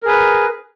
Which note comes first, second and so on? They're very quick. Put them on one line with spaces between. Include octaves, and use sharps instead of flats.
A#4 G#4 B4